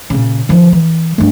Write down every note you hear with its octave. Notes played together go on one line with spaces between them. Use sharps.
A#2 C#3
D#3 F3
E3
G2 A3